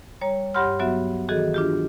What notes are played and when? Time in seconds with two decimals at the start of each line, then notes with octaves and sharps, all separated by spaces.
0.21 G3 C#5 A#5
0.54 G2 G4 C#5 F#5 C6 F6
0.79 F#3 B3 F#4 E5
1.29 D#3 E3 F#4 G#4 A4 D#5
1.54 D4 F4 G4